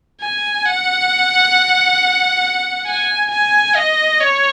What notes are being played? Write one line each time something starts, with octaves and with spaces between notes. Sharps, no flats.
G#5
F#5
G#5
G#5
D#5
C#5